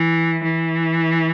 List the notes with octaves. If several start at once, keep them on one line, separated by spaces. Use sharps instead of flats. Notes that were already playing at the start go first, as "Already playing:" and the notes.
Already playing: E3
E3